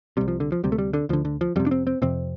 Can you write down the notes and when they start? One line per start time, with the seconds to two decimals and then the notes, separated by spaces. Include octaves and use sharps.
0.17 C3 G3
0.21 C2
0.28 F3
0.40 D3
0.52 F3
0.63 D2 C3 G3
0.72 A3
0.78 G3
0.93 D3
1.09 D2 D3 F3
1.25 D3
1.41 F3
1.56 F2 C3 G3
1.66 D4
1.71 C4
1.87 C4
2.02 F2 C3 C4